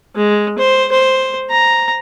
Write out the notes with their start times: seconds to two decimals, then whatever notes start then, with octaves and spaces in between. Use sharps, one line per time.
0.16 G#3
0.59 C5
0.92 C5
1.50 A#5